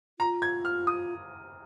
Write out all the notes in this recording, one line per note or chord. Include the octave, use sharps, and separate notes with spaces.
F4 A#5
G#6
F6
D#6